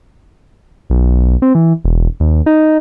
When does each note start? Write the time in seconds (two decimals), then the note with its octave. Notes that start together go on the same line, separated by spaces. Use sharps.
0.90 B1
1.42 C4
1.55 E3
1.85 E1
2.20 D#2
2.46 D#4